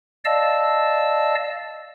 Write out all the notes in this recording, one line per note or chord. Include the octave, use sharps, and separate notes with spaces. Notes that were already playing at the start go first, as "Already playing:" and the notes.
D5 D#5 F5 A5 E6